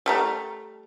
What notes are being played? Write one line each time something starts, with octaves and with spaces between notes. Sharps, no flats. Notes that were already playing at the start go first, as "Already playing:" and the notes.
G3 A3 A#5